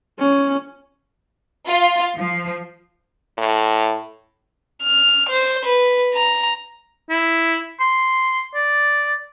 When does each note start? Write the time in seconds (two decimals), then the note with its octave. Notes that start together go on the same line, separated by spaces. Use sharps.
0.19 C#4
1.67 F4
2.15 F3
3.38 A2
4.82 F6
5.29 C5
5.65 B4
6.14 A#5
7.10 E4
7.80 C6
8.55 D5